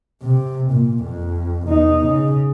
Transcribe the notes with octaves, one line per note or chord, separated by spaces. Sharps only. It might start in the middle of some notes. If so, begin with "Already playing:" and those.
C3
A#2
F2
E2 D#4
C#3